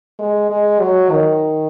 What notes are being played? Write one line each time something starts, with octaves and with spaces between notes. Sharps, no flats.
G#3
G#3
F#3
D#3